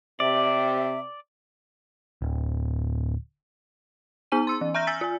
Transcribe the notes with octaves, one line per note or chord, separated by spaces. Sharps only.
C3 D5 E5
D1
B3 D#4 G#5 D#7
C6 E6
E3
E5 A#5 F6 G6 A#6
G#5 E6 G6 A6 B6
F4 G#5